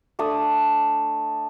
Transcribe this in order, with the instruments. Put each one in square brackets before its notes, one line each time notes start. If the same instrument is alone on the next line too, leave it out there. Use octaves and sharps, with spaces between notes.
[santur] A3 D4 A5 D#6